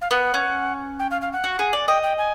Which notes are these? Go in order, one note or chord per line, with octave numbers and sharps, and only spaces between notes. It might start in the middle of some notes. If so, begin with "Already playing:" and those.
F5
B3 F#5
C#4
G5
F5
F5
F#5
F#4
G#4
D5
D#5 G5
G5
G#5